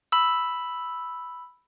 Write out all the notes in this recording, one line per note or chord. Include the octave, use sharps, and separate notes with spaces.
B5 E6